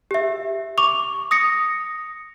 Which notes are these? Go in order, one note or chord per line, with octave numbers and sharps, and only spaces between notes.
G4 E5
C#6 D6 F7
D#6 A#6 C#7